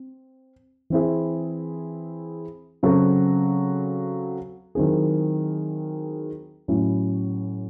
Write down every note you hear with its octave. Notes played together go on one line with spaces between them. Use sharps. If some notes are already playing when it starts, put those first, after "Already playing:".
Already playing: C4
E3 C4 E4 G#4
C#3 F#3 C4 F#4 A4
D#3 F#3 C4 E4 G#4
A2 F#3 C#4 E4